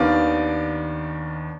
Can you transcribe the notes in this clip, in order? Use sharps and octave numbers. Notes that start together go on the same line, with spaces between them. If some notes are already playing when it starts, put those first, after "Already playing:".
Already playing: D#2 D#3 B3 D4 D5 F5